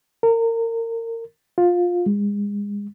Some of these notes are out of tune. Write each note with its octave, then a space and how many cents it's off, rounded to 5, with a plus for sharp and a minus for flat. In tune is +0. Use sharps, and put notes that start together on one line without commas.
A#4 -30
F4 +15
G#3 -30